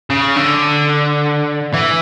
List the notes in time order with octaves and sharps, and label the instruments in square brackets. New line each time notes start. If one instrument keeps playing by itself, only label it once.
[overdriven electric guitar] C#3
D3
E3